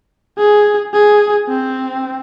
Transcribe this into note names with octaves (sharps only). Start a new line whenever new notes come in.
G#4
G#4
C4